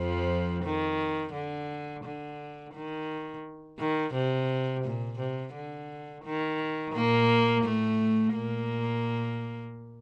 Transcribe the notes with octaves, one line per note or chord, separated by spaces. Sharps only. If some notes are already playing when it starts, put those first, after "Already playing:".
Already playing: F2 F3
D#3
D3
D3
D#3
D#3
C3
A#2
C3
D3
D#3
A#2 A#3
A2 A3
A#2 A#3